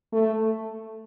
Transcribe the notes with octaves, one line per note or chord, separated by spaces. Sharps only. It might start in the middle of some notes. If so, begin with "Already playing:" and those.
A3